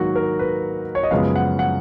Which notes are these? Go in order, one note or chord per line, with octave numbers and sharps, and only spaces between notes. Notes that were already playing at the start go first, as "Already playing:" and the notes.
Already playing: G#2 D#3 F#3 A#3 F#4
A#4
B4
C#5
D#5
F#2 C#3 F3 G#3 B3 F5
F#5
F#5